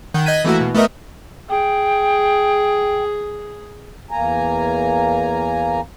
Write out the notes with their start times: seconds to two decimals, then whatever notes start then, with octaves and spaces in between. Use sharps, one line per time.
0.14 D#3 F#5 G6
0.26 D#5 F#6 G#6 B6 D#7
0.45 E3 A3 A#3 E4 F#4
0.61 B2
0.74 A3 B3 A#4 D#5 E5
1.50 G#4 G5
4.11 E2 A#3 G#5 A#5